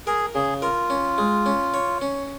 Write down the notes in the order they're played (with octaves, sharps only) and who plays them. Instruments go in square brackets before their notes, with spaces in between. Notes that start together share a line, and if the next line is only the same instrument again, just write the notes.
[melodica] G#4 [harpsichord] A#4
[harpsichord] C#3 [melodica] G#4
[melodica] F4 [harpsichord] A#4
[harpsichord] C#4
G#3
C#4
C#5
C#4